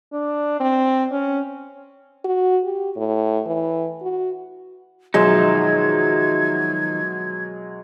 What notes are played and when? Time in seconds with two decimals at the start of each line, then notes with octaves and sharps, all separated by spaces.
0.13 D4
0.60 C4
1.12 C#4
2.25 F#4
2.64 G4
2.96 A2
3.46 E3
4.02 F#4
5.14 B2 D#3 F3 F#3 G#3 D#4 E5 G#6